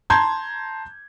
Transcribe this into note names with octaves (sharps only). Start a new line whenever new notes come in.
A5 A#5 C6 G6 G#6